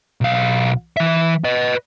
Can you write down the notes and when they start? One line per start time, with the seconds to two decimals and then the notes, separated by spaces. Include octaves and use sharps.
0.21 B1 F5
0.97 E3 E5
1.44 B4 D#5